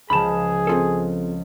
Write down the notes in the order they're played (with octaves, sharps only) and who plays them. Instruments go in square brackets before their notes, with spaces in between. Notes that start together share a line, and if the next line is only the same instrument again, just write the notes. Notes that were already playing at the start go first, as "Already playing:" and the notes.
[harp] C#2 F3 [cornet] G#4 [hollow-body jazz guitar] A5 B5
[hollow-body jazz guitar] C4 F4 A4